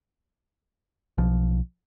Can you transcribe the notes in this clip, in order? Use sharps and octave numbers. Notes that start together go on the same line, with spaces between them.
B1 F3